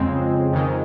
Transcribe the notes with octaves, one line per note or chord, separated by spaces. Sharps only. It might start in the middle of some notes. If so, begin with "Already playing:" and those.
Already playing: F2 C#3 G#3 C4
F2 D#3 G#3